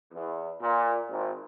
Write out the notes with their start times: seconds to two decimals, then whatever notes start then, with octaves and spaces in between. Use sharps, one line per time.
0.13 E2
0.61 A#2
1.09 G#1